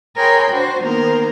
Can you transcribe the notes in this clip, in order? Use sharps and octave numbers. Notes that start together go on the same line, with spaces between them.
G#4 A#4 C#5 G5 B5 C6
D4 F#4 C5
D#3 A#3 B3 A#4 C5